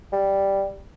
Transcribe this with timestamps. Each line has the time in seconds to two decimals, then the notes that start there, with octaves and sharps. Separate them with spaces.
0.13 G3